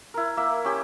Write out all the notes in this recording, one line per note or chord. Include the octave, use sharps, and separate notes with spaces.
E4 A#4
A#3 E5
C#4 G4